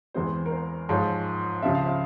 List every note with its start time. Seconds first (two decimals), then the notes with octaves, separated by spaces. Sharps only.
0.14 E2 E3 G#3 C4 C5
0.46 A#4
0.51 C5
0.89 G#2 F3 G#3 C#5
1.62 C#2 C#3 F3 C4 E5
1.75 F5
1.87 E5